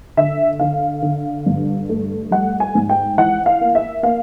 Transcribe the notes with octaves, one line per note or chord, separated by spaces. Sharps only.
D3 E5
D3 F5
D3
G2
A3
G3 F#5
G#5
G#2
G5
E3 F#5
F5
A#3
E5
A#3 F5